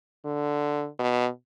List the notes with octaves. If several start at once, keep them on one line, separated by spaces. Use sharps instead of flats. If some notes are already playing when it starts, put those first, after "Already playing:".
D3
B2